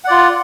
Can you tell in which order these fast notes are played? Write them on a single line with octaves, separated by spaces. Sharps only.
F#5 D5 F4